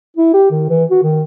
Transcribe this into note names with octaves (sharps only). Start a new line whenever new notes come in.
E4
G4
D#3
E3
F#4
D#3